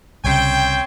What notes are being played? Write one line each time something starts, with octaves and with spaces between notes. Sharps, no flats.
C2 C#3 C4 C#5 G5